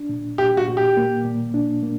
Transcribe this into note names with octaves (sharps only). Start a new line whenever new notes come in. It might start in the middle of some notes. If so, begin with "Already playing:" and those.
Already playing: D4
A#2
A#2 G4
F#4
A#2
G4
A#3
A#2
D4
A#3